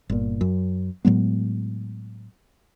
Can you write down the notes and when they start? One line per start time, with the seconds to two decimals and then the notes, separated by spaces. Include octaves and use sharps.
0.10 G1 A#2
0.41 F#2
1.05 A2 F#3 G#3 B3